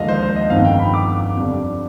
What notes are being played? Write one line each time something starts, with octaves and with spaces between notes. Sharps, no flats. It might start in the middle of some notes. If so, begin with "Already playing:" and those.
Already playing: D#2 D3 F3 G#3 D#5 F5
C5
C5
D#5
G1 F2 D#3 F5
G5
B5
D6
F2 D3 G3